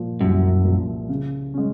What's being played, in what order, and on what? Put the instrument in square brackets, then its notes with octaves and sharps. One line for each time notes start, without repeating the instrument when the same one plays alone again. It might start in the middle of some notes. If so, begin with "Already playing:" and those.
Already playing: [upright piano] A#2 F3
[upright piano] C2 [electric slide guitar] F#2
[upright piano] A#2 F3
C#3
G#3 C#4